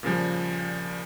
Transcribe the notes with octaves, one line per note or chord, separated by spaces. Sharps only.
A#2 C#3 F3 G3